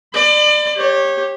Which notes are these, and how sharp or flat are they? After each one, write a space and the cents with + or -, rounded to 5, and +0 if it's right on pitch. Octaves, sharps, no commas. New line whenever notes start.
D5 +30 B5 +40
G4 +0 C#5 -25